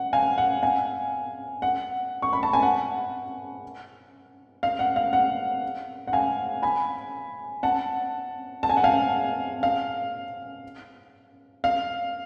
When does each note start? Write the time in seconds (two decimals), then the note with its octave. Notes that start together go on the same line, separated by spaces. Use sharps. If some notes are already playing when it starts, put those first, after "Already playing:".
Already playing: F#5
0.13 F5 G#5
0.38 F#5
0.62 F5 G#5
1.62 F#5
2.22 C#6
2.33 B5
2.43 A5
2.53 G#5
2.63 F#5
4.63 F5
4.79 F#5
4.96 F5
5.13 F#5
6.07 F#5
6.13 F5 G#5
6.62 G#5 B5
7.63 F#5 A5
8.63 A5
8.70 G#5
8.77 F#5
8.84 F5 G#5
9.63 F5
11.64 F5